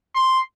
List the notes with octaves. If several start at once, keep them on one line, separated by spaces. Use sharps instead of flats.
C6